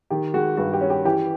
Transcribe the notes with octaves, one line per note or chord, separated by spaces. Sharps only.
D#3 G4
G#3 F#4
G2 F#4
G4
C#4
G4
E3 G4